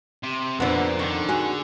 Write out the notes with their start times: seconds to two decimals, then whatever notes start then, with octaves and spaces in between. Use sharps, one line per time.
0.23 C3
0.60 F2 A#2 D3 B3 C5
0.99 D3 D#3
1.29 F#4 G#4